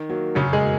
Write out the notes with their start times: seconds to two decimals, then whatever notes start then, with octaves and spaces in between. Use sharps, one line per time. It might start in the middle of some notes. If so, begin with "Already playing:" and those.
Already playing: D#3
0.09 F#3 A#3
0.35 F#2 C#3 C#4
0.53 G#3 G#4
0.61 A#3